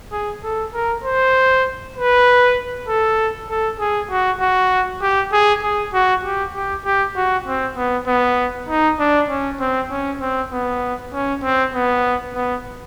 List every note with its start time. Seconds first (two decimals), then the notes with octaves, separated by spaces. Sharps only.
0.13 G#4
0.44 A4
0.74 A#4
1.04 C5
1.97 B4
2.89 A4
3.49 A4
3.80 G#4
4.11 F#4
4.41 F#4
5.02 G4
5.32 G#4
5.63 G#4
5.94 F#4
6.24 G4
6.55 G4
6.85 G4
7.16 F#4
7.47 C4
7.77 B3
8.07 B3
8.69 D#4
9.00 D4
9.29 C#4
9.60 C4
9.91 C#4
10.21 C4
10.52 B3
11.13 C#4
11.43 C4
11.75 B3
12.35 B3